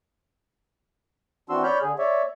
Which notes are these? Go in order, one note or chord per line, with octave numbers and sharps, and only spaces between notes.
E3 C4 D4 F#4 C6 E6
C#5 D5 B5 F6 G6
D3 G#4
C#5 D5 E5